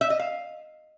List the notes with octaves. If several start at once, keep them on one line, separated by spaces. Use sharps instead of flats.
E5
D#5
F5